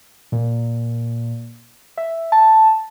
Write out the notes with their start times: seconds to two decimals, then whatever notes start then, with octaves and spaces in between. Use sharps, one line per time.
0.32 A#2
1.97 E5
2.32 A5